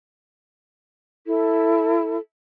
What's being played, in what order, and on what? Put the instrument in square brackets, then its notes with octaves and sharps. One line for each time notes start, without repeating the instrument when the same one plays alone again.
[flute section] E4 A4